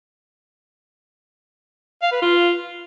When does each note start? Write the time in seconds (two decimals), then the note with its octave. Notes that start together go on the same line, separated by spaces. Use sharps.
2.03 F5
2.12 B4
2.22 F4